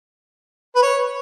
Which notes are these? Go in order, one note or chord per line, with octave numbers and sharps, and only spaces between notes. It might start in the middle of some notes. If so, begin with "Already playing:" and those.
B4
C#5